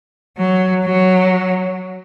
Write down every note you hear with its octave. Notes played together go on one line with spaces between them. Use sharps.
F#3
F#3